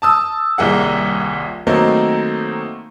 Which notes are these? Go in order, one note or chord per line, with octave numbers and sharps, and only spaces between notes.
A5 D#6 E6
D#1 C2 A#3 G#4 F#5
D#3 F#3 A3 A#3 C4 D#4